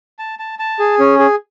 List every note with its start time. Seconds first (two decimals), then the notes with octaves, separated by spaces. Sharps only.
0.19 A5
0.39 A5
0.59 A5
0.79 G#4
0.99 C#4
1.19 G#4